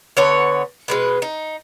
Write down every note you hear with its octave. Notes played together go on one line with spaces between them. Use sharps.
D3 B3 C#5
B2 G#3 B4
D#4